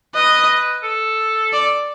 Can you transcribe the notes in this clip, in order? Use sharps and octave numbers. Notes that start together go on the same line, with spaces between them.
B4 D#5
A4
D5